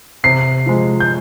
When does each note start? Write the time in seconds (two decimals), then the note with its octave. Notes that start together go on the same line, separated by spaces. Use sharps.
0.24 C3 C7
0.66 F3 G#3
1.00 G6